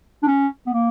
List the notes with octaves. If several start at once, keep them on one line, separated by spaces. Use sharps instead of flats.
D4
C#4
B3
A#3